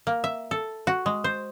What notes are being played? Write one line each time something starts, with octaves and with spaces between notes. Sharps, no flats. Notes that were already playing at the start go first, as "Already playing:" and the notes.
A#3
E5
A4
F#4
G#3
C5